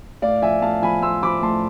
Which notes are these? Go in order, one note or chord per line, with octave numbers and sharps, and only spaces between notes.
A2 D5 F5
F3 E5 G#5
A2 F5 A5
F3 G#5 B5
A2 C6 E6
F3 B5 D6
A2 A5 C6